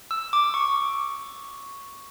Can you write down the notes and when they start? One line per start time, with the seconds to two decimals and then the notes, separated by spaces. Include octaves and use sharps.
0.11 E6
0.33 D6
0.54 C#6